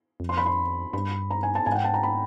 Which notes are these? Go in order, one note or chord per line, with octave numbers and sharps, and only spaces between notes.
F2
C6
B5
C6
G2 B5
A#5
G#5
A5
G#2 G#5
F#5
G5
A5
A#5
B5